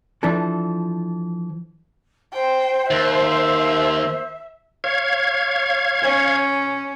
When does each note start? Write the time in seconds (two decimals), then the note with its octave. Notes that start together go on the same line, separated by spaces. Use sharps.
0.23 E3 F3 D4 A4
2.33 C5 G5
2.90 D#2 A#4 E5 C6 E6
4.84 C#5 F5 G#6
6.02 C#4